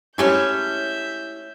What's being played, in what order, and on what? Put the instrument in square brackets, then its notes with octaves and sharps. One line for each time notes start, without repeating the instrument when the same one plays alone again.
[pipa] G#3 A3 C#4 [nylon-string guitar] E4 G4 C#5 [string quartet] E5 G6